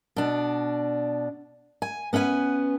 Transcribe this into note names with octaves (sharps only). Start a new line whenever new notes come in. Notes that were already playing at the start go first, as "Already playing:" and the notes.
B2 D4
G#5
B3 C#4 B4 F5 G#5